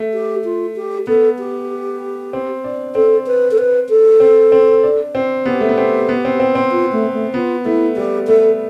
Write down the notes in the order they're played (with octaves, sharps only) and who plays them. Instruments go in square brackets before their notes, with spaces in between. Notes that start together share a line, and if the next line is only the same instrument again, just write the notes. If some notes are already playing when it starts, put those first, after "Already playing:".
Already playing: [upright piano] A3
[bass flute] G4
F4
G4
[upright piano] B3 [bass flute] A4
[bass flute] G4
[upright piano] C4
D4
[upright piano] C4 [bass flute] A4
[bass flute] B4
A4
B4
A4
[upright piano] C4
C4
D4
C4
[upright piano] B3 [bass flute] G4
[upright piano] A3
B3
C4
B3
C4
C4
C4
[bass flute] F4
A3
A3
[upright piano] B3 [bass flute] F4
[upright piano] A3 [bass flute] E4
[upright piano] G3 [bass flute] G4
[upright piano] A3 [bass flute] A4